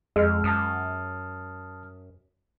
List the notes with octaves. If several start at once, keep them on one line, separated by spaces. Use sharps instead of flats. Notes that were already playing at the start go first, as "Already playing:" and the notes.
F2 G#3 E6 F6
F#2 A5 D#6 F6